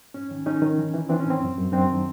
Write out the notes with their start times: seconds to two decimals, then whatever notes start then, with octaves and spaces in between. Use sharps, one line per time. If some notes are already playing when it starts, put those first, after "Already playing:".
0.14 G#2 C#4
0.31 D#3
0.46 D#3 C#4 D#4
0.62 D#3
0.78 E3
0.94 E3
1.09 E3 C4 D4
1.20 C#4
1.25 A2
1.30 C4
1.41 F#2
1.58 F#2
1.72 F#2 C4 D4
1.89 D#3